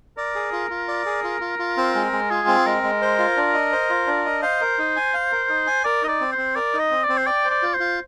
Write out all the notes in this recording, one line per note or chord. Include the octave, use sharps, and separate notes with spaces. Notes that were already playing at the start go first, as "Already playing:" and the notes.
A#4 D5
G#4
F4
F4
D5
G#4
F4
F4
F4
C4
G#3
G#3
F4 G#4
C4
G#3 A#4
G#3
C5
F4
D4
D#5
C5
F4
D4
D#5
C5 F5
A#4
D#4
G#5
F5
A#4
D#4
G#5
A#4 D5
D#4 D#5
D5
C4
C5
C4
A#4 D5
D#4
D#5
C4
D5
C4
C5
D5 G5
C5
D5
F4
C5
F4